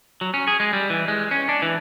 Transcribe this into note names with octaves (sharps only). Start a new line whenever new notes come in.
F#3
C#4
G#4
G#3
G3
E3
G#3
C#4
D4
E3